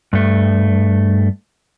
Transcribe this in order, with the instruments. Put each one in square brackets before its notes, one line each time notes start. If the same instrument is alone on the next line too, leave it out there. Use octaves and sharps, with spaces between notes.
[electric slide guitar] G2 A3